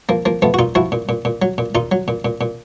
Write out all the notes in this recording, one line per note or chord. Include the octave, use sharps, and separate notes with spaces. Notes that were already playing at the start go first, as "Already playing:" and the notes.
F3 A#3
F3 A#3
F3 A3 B3
F#4
A#2 D#4 F4
F3 E4 F#4
A#2
A#2
A#2
F#3
A#2
A#2 D#4 F4
F#3
A#2
A#2
A#2